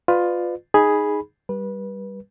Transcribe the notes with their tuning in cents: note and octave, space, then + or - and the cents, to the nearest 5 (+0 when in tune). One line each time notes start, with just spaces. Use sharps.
F4 +15 B4 +25 D5 +35
D#4 +0 G#4 +0 B5 -10
G3 +0 B4 -25